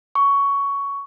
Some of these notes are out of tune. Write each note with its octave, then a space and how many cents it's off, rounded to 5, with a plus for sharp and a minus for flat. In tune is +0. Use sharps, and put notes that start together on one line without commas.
C#6 +15